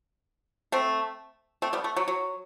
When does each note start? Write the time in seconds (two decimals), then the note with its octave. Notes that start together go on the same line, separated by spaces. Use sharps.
0.72 A3 C4
1.62 A3 C4
1.73 G3 B3
1.84 A3
1.96 F#3
2.08 F#3